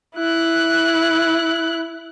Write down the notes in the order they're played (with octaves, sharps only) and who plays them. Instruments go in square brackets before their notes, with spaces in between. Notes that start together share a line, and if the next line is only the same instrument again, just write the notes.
[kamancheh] E4 F#6